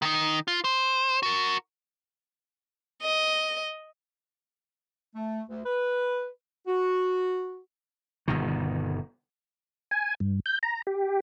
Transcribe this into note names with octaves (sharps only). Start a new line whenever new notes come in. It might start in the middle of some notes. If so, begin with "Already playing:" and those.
D#3 D#4
F4
C5
F#4 A#4
D#5
A3
D2
B4
F#4
G1 B2 D#3
G#5
G2
G6
A#5
G4